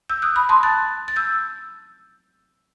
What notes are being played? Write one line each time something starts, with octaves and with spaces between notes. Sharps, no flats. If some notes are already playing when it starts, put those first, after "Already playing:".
E6 G6
D#6 F#6
B5 D#6
A5 C6
F#6 A6
A6
E6 G6